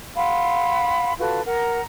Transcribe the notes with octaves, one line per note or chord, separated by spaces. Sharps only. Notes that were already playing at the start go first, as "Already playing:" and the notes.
F5 F#5 B5 C6
F4 F#4 A4 B4
A#4 F#5 A#5